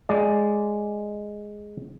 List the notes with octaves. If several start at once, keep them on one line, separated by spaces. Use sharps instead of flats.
G#3 D5